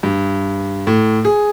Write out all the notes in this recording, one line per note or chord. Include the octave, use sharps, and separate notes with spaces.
G2
A2
G#4